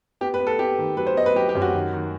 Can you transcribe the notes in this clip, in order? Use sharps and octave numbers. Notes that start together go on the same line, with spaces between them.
B3 G4
B4
B3
A4
B3 G4
D#3
F#3 B4
C5
B3 D#5
B4
F#3 G4
G4
F#2
F#4
D#3
D#3